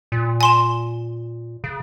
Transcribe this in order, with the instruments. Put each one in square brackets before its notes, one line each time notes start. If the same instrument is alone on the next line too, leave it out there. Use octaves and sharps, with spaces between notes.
[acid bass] A#2
[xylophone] G#5 C6 E7
[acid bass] C#3